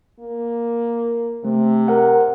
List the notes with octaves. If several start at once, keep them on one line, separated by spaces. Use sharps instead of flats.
A#3
C3 A3
A#4 F#5